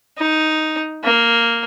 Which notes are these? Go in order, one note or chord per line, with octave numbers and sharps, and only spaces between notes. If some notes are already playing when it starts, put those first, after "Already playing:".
D#4
A#3